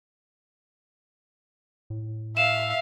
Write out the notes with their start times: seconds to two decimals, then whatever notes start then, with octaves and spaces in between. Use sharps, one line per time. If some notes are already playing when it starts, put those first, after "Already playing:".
1.90 A2
2.37 E5 F5 E7